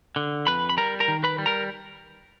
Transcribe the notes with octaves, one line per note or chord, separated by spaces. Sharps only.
D3
F2 B4 B5
B5
G3 A#4 A#5
A#4 A#5
D#3
B4 B5
G3
A#4 A#5